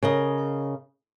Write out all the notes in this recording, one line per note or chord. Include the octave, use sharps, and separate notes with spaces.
C#3 A#4 D#5